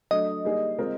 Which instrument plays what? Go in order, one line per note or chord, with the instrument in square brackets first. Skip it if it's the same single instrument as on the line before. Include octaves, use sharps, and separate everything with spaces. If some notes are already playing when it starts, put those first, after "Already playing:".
[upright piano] F#3 A3 D4 [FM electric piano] D#5
[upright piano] G3 A#3 D#4 G#4
G#3 C4 F4 A#4